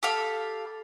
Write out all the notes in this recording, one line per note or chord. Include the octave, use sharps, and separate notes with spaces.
G4 A4 F5 B5